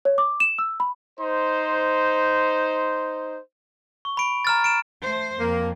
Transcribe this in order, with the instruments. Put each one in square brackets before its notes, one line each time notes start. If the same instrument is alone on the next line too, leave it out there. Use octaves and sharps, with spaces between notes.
[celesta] C#5
D6
E7
E6
B5
[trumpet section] D#4 C5
[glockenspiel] C#6
B5 D7
A#5 F6 A6
D7 E7
[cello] A3 C5
[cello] F2 [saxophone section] A#3